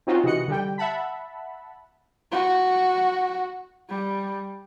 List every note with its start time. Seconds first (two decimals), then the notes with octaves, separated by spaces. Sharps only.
0.07 C4 C#4 D#4 F4 F#4 C5
0.24 C3 E3 F#4 D#5 F#6 C#7
0.48 D3 G3 G5
0.78 E5 F#5 A5 B5
2.32 F#4
3.89 G3